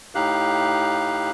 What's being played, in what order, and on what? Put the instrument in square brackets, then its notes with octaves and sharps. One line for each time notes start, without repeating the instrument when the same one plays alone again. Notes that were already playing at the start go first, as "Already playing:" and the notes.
[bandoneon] A2 D#4 G4 F5 F#6